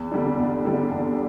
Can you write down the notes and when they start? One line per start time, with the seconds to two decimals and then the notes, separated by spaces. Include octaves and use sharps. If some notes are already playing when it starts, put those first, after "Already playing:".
Already playing: E2
0.12 D3 G3 D4
0.39 E2
0.65 D3 G3 D4
0.91 E2